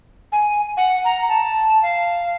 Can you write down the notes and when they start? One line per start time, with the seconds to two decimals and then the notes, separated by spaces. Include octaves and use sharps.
0.32 G#5
0.77 F#5
1.05 A#5
1.29 A5
1.83 F5